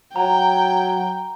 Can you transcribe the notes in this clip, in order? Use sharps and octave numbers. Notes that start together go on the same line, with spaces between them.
F#3 G5 A#5